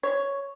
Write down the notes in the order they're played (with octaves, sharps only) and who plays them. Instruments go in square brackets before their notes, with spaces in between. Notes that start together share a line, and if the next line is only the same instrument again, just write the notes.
[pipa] C#5